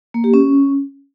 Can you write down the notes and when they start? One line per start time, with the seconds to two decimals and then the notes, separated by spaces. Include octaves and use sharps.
0.14 A#3
0.24 G4
0.34 C#4